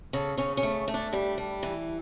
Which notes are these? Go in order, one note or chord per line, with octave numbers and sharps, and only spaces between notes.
C#3 A4
C#3 C#4
C#4
A3
A3
D4
G3 D4
G3
E3